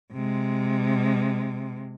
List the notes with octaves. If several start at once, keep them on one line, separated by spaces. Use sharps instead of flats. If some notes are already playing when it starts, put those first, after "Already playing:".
C3 G#3